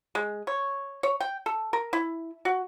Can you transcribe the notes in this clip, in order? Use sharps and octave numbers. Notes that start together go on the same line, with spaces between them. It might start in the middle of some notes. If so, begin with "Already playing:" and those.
G#3
C#5
C#5
G5
A4
A#4
E4
F#4